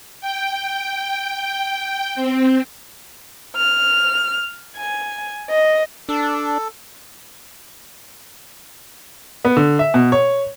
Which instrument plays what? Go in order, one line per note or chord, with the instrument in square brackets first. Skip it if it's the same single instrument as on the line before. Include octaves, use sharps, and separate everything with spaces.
[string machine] G5
C4
[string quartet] F6
G#5
D#5
[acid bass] D4 [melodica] A4
[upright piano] B3
D3
E5
B2
C#5